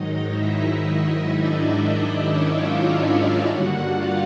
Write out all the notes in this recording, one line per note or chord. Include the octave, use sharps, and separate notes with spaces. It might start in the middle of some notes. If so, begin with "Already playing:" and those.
Already playing: G#2 D#3 F#3 D#4 D#5
E4 E5
D#4 D#5
D#4 D#5
D4 D5
E4 E5
C#4 C#5
F4 F5
G2 D3 G3 A#3 F#4 F#5
F4 F5